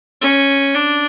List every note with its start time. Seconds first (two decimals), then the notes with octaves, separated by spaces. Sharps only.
0.22 C#4
0.74 D4